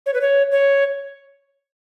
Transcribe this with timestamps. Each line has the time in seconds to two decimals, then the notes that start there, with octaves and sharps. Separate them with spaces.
0.06 C#5
0.14 B4
0.21 C#5
0.52 C#5